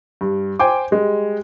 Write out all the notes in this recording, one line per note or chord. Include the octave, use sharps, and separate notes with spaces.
G2
C5 G5 G#5 D6
G3 G#3